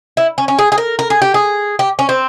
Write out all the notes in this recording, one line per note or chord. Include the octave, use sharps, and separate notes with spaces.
E4
C#4
C#4
G#4
G#4
A#4
A#4
G#4
G4
G#4
G4
C#4
C4